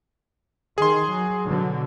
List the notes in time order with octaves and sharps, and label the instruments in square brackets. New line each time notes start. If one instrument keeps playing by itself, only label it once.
[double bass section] D#3 [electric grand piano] G#4 C6
[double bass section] F#3
B2 D3 F#3